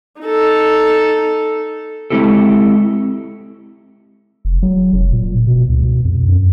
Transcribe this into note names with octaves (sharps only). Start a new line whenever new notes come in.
D#4 A4
G#3 C4 E4 G4 A4
F1
F#3
F1
A#2
B2
C#2
B2
F2
F#2